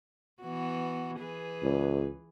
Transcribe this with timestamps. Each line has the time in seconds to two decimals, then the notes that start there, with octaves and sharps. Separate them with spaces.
0.42 E3 B3 F#4
1.19 E3 G#4 B4
1.63 C#2